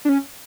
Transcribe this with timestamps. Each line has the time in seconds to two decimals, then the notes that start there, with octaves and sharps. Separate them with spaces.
0.05 D4
0.09 C#4